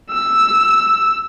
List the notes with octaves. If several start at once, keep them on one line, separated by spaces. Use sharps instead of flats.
E6